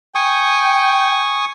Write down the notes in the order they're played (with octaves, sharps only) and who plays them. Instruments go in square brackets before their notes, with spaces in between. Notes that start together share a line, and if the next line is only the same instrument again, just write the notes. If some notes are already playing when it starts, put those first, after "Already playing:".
[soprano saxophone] G5 [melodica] G#5 C#6 D#6